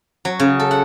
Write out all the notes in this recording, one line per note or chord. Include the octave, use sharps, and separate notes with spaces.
F#3
C#3
A4
F#5